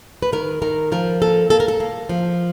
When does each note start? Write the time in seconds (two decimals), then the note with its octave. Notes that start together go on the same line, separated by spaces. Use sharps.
0.22 B4
0.32 D#3 A#4
0.62 D#3 A#4
0.92 F3 A#4
1.21 A#3 A4
1.50 A#3 A4
1.60 A#4
1.68 A4
1.80 A#3
2.09 F3